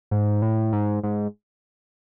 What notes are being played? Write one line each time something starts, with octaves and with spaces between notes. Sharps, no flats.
G#2
A2
G#2
G#2